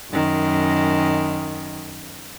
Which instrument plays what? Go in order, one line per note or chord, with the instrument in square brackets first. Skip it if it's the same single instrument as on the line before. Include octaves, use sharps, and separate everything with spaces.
[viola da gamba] F#2 D#3